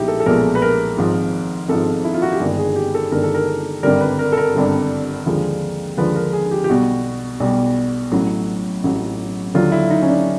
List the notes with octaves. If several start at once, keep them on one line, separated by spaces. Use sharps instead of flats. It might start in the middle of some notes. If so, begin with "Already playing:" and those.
Already playing: B1 A#2 F3 G#3 D#4 E4 G4
A4
A4
B1 A#2 F3 G#3 A#4
B4
A#4
G#1 G#2 F3
G#1 G#2 F3 A4
E4
F4
F#4
G4
G1 G2 D#3 G#3 G#4
G#4
G4
A4
G1 G2 D#3 G#3 A#4
A4
A#4
G#1 G2 D3 G3 A#4
B4
A#4
A4
A#4
G#1 G2 D3 G3
D#2 D3 F3 G#3
D#2 D3 F3 G#3 B4
A#4
G#4
G4
G4
B1 B2 G3 F#4
B1 B2 G3
A1 A2 F#3
A1 A2 F#3
D#2 D3 F#3 F4
E4
D#4
C#4
D4